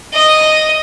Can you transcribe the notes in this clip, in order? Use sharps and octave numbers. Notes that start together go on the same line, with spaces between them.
D#5